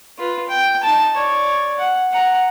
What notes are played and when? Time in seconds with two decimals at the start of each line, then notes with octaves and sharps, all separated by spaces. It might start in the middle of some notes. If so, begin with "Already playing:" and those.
0.19 F4 B4
0.49 G5
0.83 D#4 A5
1.14 C#5 D5
1.78 F#5
2.11 F#5 A#5